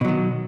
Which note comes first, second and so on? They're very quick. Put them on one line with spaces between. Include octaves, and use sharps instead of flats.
B2 F#3 D#3